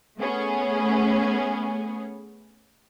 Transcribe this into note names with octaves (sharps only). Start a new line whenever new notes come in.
A3 B3 C#4 G#4